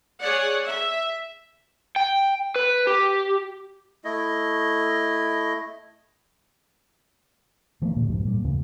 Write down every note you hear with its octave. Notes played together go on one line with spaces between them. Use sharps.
G#4 C#5 D5 F#5
E5
G5
B4
G4
A3 E4 D#5
D#3 F3 A3 A#3
D#1 A#2 D3
C2 G#2 F3
A#2 G3
D2 G#2 C#3